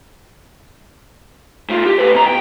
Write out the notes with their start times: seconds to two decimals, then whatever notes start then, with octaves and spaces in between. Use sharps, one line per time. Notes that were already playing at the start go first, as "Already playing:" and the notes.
1.69 A2 F4
1.86 G4
1.99 A2 B4
2.15 B2 A#5
2.26 G5